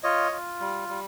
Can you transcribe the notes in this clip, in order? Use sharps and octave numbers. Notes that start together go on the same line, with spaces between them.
F4 C#5 D#5
F4
G3
G3